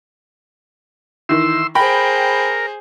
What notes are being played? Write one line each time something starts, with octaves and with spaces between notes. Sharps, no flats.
D#3 E3 C6 E6
G#4 A#4 C5 G5 B5